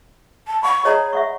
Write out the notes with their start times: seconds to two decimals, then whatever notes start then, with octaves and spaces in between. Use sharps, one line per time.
0.47 A5
0.63 F#5 B5 C#6
0.85 G#4 C#5 D#5 A#5
1.13 E5 F#5 C#6